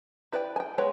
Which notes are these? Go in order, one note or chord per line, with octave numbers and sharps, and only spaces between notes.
E4 B4 D5 E5 G5
G5 G#5
G#3 B3 B4 C#5 G5